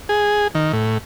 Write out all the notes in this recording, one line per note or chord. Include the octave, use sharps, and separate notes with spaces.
G#4
D#3
A2